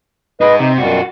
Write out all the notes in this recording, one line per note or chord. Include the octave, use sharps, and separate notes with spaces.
D#4 G#4 B4 D#5
C3 D#4
F#2 B2 G3 F4 F#4